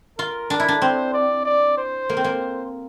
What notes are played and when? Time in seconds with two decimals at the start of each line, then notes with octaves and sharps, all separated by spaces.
0.18 F4 A#4
0.50 D4
0.60 E4
0.68 D4
0.82 C4 C5
1.14 D5
1.45 D5
1.78 C5
2.09 A#3
2.17 C4
2.24 A#3